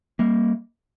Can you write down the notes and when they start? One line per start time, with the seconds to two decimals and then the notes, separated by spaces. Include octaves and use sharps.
0.19 G3 A#3